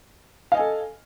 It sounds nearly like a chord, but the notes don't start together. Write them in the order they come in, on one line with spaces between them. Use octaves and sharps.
F5 D#5 G#5 A4